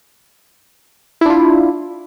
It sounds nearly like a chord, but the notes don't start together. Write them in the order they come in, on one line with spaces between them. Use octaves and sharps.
E4 D4 F4